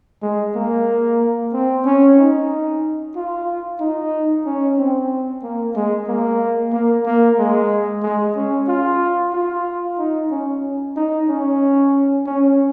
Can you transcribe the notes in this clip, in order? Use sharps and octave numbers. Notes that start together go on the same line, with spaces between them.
G#3
A#3
C4
C#4
D#4
F4
D#4
C#4
C4
A#3
G#3
A#3
A#3
A#3
G#3
G#3
C#4
F4
F4
D#4
C#4
D#4
C#4
C#4